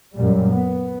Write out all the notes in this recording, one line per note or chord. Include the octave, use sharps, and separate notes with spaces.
F#2 A#2 G3
B3